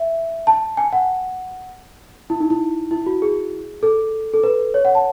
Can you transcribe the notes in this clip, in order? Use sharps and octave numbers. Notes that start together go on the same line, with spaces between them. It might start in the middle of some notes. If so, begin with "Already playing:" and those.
Already playing: E5
A5
G#5
F#5
E4
D#4
E4
E4
F#4
G#4
A4
A4
B4
C#5
F#5
A5